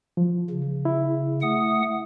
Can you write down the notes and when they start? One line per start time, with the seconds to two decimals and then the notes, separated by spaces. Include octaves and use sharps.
0.17 F3
0.50 C#3
0.85 E4
1.42 A3 F#5 D#6